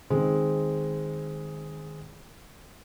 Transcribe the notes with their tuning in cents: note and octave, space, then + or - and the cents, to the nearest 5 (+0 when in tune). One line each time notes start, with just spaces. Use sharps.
D#3 -5 G#3 +0 C4 +0